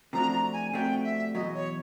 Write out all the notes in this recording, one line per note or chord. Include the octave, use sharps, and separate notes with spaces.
C3 F3 A3 D4 F#4 A#5
A#5
G#5
C3 F3 A3 D4 F#4 G5
E5
E2 B2 F#3 D#5
C#5